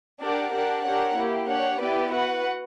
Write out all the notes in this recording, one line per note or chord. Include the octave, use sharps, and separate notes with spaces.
D4 G4 A#4 D5 F#5
D4 G4 A#4 D5 F#5
D4 G4 A#4 C#5 F#5
A#3 E4 G4
D4 G4 C#5 F#5
B3 E4 G4 B4 D5
F#4 B4 F#5